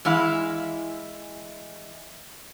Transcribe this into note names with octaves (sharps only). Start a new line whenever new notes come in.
E3 G#3 E4 F5